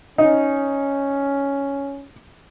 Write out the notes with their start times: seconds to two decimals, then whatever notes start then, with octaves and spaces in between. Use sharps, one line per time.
0.18 C#4 D#4